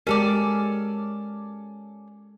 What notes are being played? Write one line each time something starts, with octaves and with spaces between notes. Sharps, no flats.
G#3 C#4 G4 A4 A#4 D5